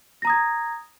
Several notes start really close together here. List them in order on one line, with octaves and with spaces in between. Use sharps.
A#6 A#5 D#6 G#6